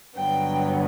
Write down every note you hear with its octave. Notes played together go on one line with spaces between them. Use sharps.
G2 D3 F#3 B3 G5